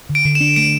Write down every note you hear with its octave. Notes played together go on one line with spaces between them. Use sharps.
D3
D7
D3
E7
D4
A3 D7